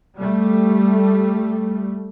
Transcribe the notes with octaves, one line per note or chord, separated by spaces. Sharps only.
G3 A3